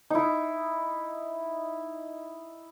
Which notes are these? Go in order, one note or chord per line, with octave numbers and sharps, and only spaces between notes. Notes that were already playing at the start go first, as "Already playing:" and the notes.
D#4 E4